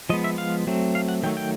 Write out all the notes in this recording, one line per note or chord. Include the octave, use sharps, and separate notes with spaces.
F3 G#3 B3 D#5
E5
F5
F#3 A3 C4
F5
F#5
D#3 F#3 A3 G5
G5